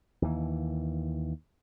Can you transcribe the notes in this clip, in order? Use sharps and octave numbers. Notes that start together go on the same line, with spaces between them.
D#2 E3